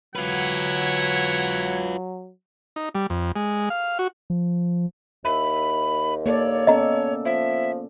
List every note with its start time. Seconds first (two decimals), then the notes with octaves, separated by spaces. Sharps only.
0.16 F#3 E4 F4 B4 C#5 F#5
2.76 D#4
2.95 G3
3.10 F2
3.36 G#3
3.70 F5
3.99 F#4
4.30 F3
5.25 D#2 E5 B5
6.26 A#3 A4 C#5 D5
6.67 B3 C#4 A4 D#5 A#5
7.25 F3 E5